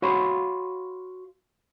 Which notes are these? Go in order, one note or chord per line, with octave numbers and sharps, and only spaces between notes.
F#4 C#5 F5 B5 C6